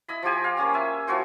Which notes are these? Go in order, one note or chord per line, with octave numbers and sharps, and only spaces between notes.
E4 D#5 B5
F3 F4 G4 G#5
F5
A#3 C#4 F4
E5 G#5
F3 E4 F#4 C5